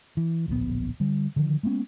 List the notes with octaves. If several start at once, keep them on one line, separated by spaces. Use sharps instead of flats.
E3
D1 A#1 A2 B3
D3 G3
D3 D#3 F3
G#3 A#3 B3 C#4